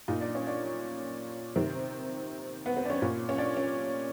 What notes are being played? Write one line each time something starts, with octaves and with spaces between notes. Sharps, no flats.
A#2 D#4
D4
C#4
D4
C3 D#3 C4
B3
C4
D4
C#4
A#2
C#4
D4
C#4